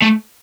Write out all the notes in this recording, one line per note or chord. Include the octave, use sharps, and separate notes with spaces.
A3